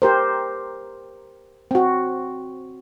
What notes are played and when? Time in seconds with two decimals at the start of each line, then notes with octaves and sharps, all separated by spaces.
0.02 G4 A#4 C5
1.71 C4 F#4